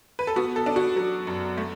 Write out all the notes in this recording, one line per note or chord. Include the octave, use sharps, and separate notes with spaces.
B4
A4
B3 F#4
A4
D4
F#4
F#3
F#2
A3